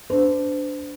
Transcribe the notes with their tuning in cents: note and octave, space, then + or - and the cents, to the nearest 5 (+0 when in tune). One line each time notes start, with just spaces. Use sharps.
D4 -10 C5 -40